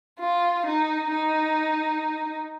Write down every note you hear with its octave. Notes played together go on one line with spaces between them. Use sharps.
F4
D#4
D#4